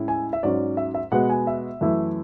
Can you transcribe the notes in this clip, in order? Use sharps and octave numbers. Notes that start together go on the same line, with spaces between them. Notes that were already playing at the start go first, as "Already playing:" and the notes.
Already playing: A2 G#3 C#4 E4
G#5
E5
G#2 F#3 C#4 D5
E5
E5
B2 G#3 B3 F#5
G#5
E5
F#2 E3 A3 E4